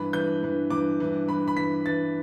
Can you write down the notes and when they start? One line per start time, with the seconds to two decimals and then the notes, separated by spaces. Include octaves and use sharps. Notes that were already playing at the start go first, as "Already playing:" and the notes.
Already playing: G2 E3 B5
0.13 G2 E3 G6
0.43 G2 E3
0.70 G2 E3 D6
1.00 G2 E3
1.28 G2 E3 B5
1.48 B5
1.57 G2 E3 B6
1.86 G2 E3 A6